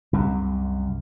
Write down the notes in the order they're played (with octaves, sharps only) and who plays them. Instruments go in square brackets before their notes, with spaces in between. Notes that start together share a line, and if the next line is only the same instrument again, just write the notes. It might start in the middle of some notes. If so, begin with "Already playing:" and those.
[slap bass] C2 F#2